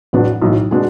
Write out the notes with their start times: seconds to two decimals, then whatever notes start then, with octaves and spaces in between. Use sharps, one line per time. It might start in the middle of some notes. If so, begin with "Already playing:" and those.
0.13 A1 A2 F#3 B3 D4
0.42 B1 A2 E3
0.71 B2 G#3 D4 G#4